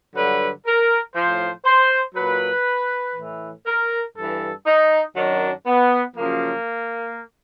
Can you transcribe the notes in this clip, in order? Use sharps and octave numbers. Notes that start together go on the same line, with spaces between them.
G2 D3 F#3 B4
A#4
A2 F3 C5
C5
A#2 F#3 B4
A2 E3
A#4
G2 E3 A4
D#4
F#2 D#3 F#3 D4
B3
F#2 C#3 F3 A#3